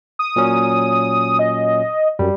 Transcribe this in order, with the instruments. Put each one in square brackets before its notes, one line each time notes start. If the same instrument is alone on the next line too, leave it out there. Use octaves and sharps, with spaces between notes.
[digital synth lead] D#6
[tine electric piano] A#2 F#3 C#4
[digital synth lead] D#5
[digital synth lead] F#2 [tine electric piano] G3